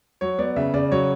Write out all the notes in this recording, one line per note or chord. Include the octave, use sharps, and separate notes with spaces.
F#3 C#5
B3 D5
C#3 E5
C#3 D5
F#3 C#5